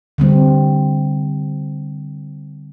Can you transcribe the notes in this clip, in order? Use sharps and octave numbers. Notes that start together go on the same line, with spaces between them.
D3 G3 C4